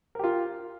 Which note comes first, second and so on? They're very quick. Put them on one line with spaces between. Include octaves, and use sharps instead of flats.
A#4 G4 F4